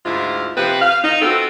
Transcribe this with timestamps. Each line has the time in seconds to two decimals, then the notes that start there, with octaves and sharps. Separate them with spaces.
0.05 D2 G#2 E4 F4
0.57 C3 F3 C4 B4
0.82 F5
1.03 D#4
1.22 B3 C4 F4 F#4 A4